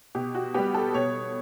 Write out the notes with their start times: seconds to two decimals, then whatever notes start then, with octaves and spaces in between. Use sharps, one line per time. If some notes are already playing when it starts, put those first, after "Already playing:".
0.15 B2 G4
0.35 F#4
0.54 G3 B3 G4
0.74 A4
0.94 B2 C#5